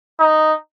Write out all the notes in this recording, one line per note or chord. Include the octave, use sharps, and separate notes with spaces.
D#4